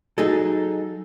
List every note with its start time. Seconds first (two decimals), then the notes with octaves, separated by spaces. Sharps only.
0.18 F#3 D#4 G#4 A4